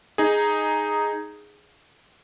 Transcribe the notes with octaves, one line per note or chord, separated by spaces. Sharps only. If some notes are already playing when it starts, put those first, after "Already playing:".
D#4 G#4